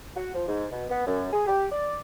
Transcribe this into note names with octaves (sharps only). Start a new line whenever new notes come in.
F#4
F3
G#2
B2
B3
F#2
G#4
G4
D5